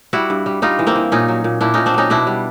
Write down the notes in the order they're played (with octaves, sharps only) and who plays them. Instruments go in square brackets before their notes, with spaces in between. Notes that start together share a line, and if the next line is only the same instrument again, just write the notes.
[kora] G3 E4 F#4
G2
G3
G3 D#4 F4
E3
A#3 C4
E3
A#2 C#4 D#4
F#3
A#2
A#2 D4 E4
A#2 C#4 D#4
C4 D4
F#3 C#4 D#4
B2 D4 E4
G3